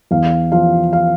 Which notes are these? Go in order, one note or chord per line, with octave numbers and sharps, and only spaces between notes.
E2 F5
F3 F5
F5